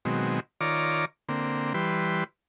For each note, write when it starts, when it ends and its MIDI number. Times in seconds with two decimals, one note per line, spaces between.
0.05 0.40 47
0.05 0.40 51
0.05 0.40 54
0.05 0.40 56
0.05 0.40 60
0.61 1.05 51
0.61 1.05 65
0.61 1.05 73
0.61 1.05 74
0.61 1.05 82
0.61 1.05 86
1.29 1.73 50
1.29 1.73 58
1.29 1.73 60
1.74 2.24 52
1.74 2.24 55
1.74 2.24 71
1.74 2.24 84